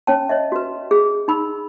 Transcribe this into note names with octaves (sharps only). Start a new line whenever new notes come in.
C#4 C#5 G5 A5
C#5 D#5 E5
F#4 B4
G#4
D#4 B5 E6